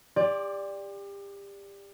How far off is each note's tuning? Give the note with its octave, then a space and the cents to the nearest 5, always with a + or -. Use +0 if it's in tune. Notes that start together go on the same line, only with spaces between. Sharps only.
G4 +30 D5 +0 C6 +20